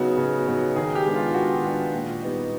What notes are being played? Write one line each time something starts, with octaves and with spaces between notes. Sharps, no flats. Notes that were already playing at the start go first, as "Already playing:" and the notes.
Already playing: C#3 F#3 B3 D#4 F#4
C#3
F#3 B3 D#4
D#3 G#4
G4
G#3 B3 D4
F4
D#3 F#4
G#3 B3 D4
A#2
G3 B3 D#4